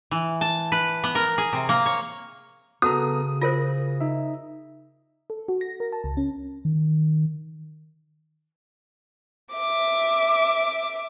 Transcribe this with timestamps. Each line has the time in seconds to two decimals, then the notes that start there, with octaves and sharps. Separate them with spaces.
0.11 E3
0.41 A5
0.72 B4
1.04 B3
1.15 A#4
1.38 G#4
1.53 C3
1.69 A#3
1.86 C#5
2.82 C#3 B3 F#4 A4 A#5 D#6
3.41 F4 A#4 C5 A#6
4.01 D#4 E5
5.30 A4
5.48 F#4
5.61 A#6
5.80 A#4
5.92 A5
6.04 C#2
6.17 C#4
6.65 D#3
9.53 E5 D6